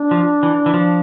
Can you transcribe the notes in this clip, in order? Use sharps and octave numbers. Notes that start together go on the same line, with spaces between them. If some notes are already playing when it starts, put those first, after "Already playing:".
Already playing: D4
F3
E3
E3
F3